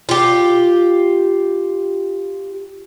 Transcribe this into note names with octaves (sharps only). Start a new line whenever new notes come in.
F4 G4